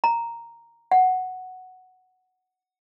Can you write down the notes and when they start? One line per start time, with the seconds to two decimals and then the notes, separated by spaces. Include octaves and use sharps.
0.04 A#5
0.91 F#5